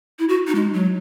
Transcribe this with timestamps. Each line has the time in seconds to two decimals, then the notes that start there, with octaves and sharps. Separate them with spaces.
0.19 E4
0.29 F#4
0.47 D#4
0.55 G#3
0.73 F#3